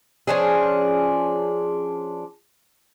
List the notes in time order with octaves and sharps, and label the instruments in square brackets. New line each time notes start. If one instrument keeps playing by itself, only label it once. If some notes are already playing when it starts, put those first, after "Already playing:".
[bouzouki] F3 C#4 D4 G#4